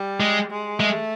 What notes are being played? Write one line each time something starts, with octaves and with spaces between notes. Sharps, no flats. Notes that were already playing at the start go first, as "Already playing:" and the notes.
Already playing: G3
G#3
G#3
G#3 A3